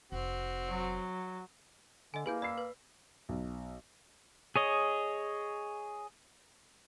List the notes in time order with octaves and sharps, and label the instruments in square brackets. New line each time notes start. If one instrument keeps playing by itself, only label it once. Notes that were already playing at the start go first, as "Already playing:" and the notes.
[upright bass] F1 [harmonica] C4 F#4
[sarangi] F#3
[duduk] D3 [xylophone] D#5 G#5
[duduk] A#3 [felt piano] E4 G#4 [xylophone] B4 G#5 G6
[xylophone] D5 [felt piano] B5 E6 C7
[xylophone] B4
[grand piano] B1
[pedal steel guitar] G#4 C#5 D#5